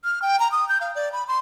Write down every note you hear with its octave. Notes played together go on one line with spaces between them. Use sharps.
F6
G5
A#5
D#6
G6
F5
D5
B5
C6